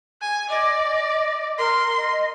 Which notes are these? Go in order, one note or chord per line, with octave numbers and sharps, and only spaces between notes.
G#5
D5 D#5
A#4 C6
D#5